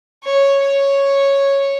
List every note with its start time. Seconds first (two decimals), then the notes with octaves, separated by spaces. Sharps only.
0.23 C#5
0.62 C#5